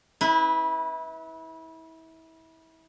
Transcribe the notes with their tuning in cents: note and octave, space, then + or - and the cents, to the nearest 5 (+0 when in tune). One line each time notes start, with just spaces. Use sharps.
E4 -30 B4 +0